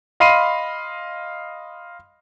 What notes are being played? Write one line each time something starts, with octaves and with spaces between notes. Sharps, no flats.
D#5 F5 B5 C6 C7 D#7